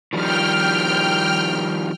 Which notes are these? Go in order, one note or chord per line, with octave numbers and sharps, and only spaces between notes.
D#3 F3 G3 G5 F6